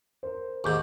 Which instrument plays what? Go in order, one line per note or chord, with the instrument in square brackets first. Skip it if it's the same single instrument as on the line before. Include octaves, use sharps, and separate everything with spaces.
[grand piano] A#4 C5
[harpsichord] D#2 G#2 [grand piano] C#6 D6 G6